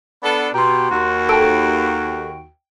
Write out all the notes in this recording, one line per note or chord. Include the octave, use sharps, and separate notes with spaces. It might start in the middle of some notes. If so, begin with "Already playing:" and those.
B3 D4 A4
B2 G4 A#5 C6
D#2 F#4
A4 G5 D7